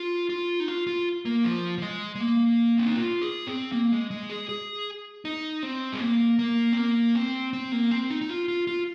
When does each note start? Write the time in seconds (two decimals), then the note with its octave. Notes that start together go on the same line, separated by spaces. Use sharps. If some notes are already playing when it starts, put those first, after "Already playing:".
Already playing: F4
0.30 F4
0.60 D#4
0.68 F4
0.87 F4
1.25 A#3
1.44 F3
1.78 F3
1.82 G#3
2.15 G#3
2.20 A#3
2.77 C4
2.87 D#4
2.96 F4
3.22 G#4
3.47 C4
3.72 A#3
3.92 G#3
4.11 G#3
4.30 G#4
4.49 G#4
5.25 D#4
5.63 C4
5.94 G#3
6.01 A#3
6.39 A#3
6.72 C4
6.77 A#3
7.15 C4
7.53 C4
7.72 A#3
7.91 C4
8.10 D#4
8.21 D#4
8.29 F4
8.48 F4
8.67 F4